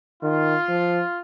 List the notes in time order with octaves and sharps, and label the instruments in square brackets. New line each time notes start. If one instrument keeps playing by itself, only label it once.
[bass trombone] D#3 [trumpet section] F4
[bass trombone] F3